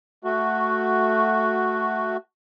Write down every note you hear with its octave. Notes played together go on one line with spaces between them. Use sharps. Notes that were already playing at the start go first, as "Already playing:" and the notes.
A3 F#4